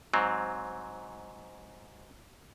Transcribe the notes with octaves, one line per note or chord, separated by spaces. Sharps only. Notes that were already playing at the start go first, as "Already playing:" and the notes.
G#2 F#3 C4